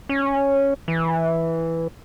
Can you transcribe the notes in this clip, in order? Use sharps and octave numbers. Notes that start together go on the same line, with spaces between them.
C#4
E3